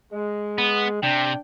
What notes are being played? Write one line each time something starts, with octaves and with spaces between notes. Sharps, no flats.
G#3
B3
C3 D4 G5